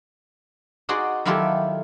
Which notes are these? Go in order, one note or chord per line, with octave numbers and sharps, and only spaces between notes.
D#4 F#4 G#4 D5 C6
D#3 F#3 E4 F4 G4 A4